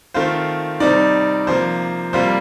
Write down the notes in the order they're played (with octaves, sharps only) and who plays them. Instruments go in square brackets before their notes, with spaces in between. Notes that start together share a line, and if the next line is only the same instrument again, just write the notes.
[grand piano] D#3 A3 C4 F4 C5
C3 G3 C4 D#4 D5
C3 F3 A#3 C5
C3 G3 A#3 F4 C5